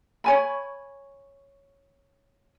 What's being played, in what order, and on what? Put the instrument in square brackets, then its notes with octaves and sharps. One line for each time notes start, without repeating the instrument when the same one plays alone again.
[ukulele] C#5 G#5 B5